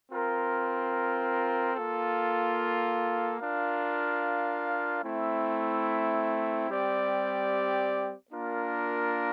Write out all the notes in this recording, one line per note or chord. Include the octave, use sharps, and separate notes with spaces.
C4 F4 A#4
A#3 F4 A4
D4 F4 A#4 F5
A3 C4 E4
G3 C4 G4 D5
A#3 D4 F4 A#4